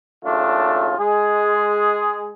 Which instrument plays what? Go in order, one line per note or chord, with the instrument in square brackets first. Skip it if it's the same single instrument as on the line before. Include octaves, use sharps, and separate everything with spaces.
[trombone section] D#2 C#3 F#3 A3 D4 F4
G#3 G#4